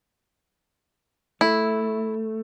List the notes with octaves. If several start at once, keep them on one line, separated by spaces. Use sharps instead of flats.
A3 E4